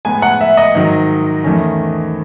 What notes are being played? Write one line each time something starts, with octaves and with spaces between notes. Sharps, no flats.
A2 G#3 B3 G#5
F#5
E5
D#5
G#2 D#3 F#3
E2 D#3 A3 C#4